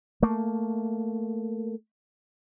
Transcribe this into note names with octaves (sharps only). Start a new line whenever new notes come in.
A3 A#3